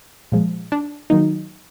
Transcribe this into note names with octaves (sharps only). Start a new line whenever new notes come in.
A#2 F3 G#3
D4
D#3 F#3 A#3 D#4